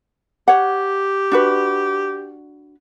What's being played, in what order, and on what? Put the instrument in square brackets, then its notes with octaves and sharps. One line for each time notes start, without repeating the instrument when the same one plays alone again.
[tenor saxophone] G4 [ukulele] C#5 F#5
[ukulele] D4 F#4 B4